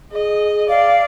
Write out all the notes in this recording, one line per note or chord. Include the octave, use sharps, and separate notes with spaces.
G#4 D#5
D5 F5